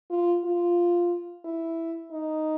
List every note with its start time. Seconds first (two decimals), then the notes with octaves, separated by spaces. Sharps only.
0.10 F4
0.44 F4
1.45 E4
2.12 D#4